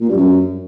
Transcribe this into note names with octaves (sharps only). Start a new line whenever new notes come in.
A#2
G2
F#2